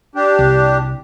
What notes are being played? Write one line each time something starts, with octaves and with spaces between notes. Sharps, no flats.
D4 G4
C2